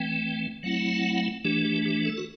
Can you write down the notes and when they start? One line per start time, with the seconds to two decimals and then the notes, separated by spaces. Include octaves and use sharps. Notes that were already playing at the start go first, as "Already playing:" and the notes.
Already playing: E3 A3 C4 G5
0.63 F#3 A3 C4 E4 F#5
1.45 E3 A3 D4 G4
1.65 G4
1.85 G4
2.05 A4
2.17 F#4